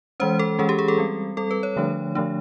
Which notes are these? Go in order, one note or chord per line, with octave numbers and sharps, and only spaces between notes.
E3 G#3 C#4 C5
A4
E3 G#3 C#4 G#4
G4
G#4
A4
G3 C4
G3 C4 A4
B4
C#5
D3 F3 A3 D4
D3 F3 A3 D4